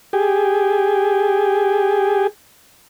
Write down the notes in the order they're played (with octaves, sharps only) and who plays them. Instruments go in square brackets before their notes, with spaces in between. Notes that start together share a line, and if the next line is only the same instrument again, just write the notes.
[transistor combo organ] G4 G#4